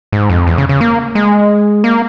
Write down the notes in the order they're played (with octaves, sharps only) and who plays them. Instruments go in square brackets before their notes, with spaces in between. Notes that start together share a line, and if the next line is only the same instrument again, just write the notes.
[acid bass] G#2
F2
E2
C#3
C#3
A#3
G#3
A#3